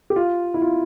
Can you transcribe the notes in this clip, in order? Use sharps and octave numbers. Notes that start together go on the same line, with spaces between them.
G4
F4
E4
F4